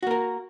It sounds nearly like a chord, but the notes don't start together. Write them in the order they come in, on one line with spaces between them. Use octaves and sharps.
F#4 A#3 A#4